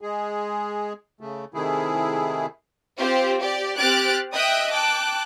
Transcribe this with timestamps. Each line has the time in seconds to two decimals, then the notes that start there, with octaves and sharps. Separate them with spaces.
0.01 G#3 G#4
1.21 C#3 A3
1.54 C3 D#3 A3 E4 G#4
2.98 C4 F4 G4 C5
3.41 G4 D5
3.77 C4 G4 F6 F#6 A6 D7
4.32 D#5 E5 G5 D#6 F#6
4.69 G5 A5 D6 F#6